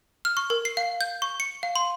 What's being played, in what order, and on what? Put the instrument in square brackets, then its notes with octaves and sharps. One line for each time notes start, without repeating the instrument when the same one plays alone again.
[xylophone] F6
C#6
A#4
C7
F5
G6
C#6
C#7
F5
C6